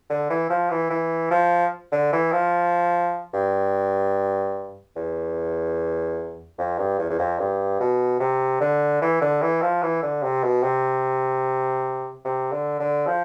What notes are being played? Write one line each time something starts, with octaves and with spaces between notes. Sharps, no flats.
D3
E3
F3
E3
E3
F3
D3
E3
F3
G2
E2
F2
G2
E2
E2
F2
G2
B2
C3
D3
E3
D3
E3
F3
E3
D3
C3
B2
C3
C3
D3
D3
F3